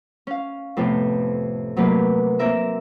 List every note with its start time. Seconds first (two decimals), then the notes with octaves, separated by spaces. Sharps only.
0.27 C#4 F5
0.77 F2 A2 C3 B3
1.76 C3 F#3 A3 A#3 B4
2.39 A#3 C4 A#4 E5